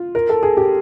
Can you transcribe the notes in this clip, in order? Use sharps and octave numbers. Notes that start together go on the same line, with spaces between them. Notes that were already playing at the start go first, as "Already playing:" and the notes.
Already playing: F4
A#4
A4
G#4
G4